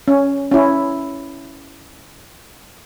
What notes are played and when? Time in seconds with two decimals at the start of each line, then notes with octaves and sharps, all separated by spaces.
0.08 C#4
0.51 C#4 E4